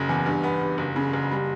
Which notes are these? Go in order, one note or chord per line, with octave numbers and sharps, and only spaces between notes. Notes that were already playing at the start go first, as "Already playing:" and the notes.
Already playing: F#1 C#3
E2
G2
B3
G2
F#1
C#3
F#1
G3